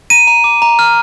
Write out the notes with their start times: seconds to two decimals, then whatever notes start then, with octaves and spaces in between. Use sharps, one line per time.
0.10 A#5 D#7
0.27 A#5
0.44 D6
0.62 A#5
0.79 F6